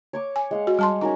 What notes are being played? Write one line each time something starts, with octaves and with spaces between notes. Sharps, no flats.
C#5 C#6 D6
G#5
G#3 F5 F#5
F#4
G3 A5 C6
C#4 D#4 F#4 A#4